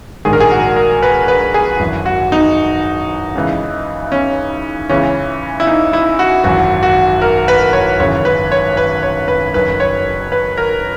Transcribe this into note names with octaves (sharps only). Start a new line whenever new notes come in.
A#1 G#2 D#3 G#4
A#4
G#4
F#4
A#4
B4
B4
G#4
G#1 F#2 E3
F#4
D#4
C#2 C#3 E3
C#4
C#2 C#3 E3 C#4
E4
D#4
E4
F#4
G#1 F#2 E3 F#4
F#4
A#4
B4
C#5
G#1 F#2 C#3 E3 C#5
B4
C#5
B4
C#5
B4
F#1 F#2 D#3 B4
C#5
B4
A#4